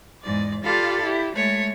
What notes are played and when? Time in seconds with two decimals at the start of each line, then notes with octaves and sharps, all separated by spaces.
0.24 E2 G#2 D5
0.65 F4 G4 A4 D5 F5 B5
1.04 E4 G4
1.36 G#3 A3 C#5